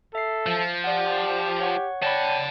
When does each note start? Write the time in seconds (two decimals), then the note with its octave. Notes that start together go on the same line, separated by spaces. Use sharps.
0.15 A4 E5 C7
0.46 F3
0.84 G4 D5 F#5
1.60 C#5 F#5 C#6
2.02 C#5 D5 F#5 G5 A5 B5